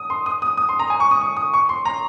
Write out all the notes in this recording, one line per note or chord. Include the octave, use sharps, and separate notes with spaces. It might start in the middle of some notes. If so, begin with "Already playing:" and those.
Already playing: D#6
C6
D#6
D#6
D#6
C6
A#5
G#5
C#6
D#6
D#6
D#6
C#6
C6
A#5